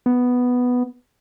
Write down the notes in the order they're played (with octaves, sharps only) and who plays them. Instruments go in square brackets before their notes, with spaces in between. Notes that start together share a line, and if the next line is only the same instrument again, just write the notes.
[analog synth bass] B3